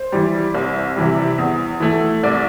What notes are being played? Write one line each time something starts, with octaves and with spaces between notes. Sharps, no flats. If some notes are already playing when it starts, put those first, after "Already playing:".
Already playing: C5
E3 G3
C2
C3 E3 G3
E2
E3 A3
C2 D5